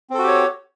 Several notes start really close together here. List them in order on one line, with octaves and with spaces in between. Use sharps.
C4 A4 F#4 G4 C#5